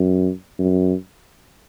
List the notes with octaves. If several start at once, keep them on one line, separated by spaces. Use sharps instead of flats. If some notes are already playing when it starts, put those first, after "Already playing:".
Already playing: F#2
F#2